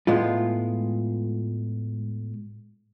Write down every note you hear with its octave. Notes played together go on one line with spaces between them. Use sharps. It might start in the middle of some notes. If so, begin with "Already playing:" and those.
A2 G#3 B3 F4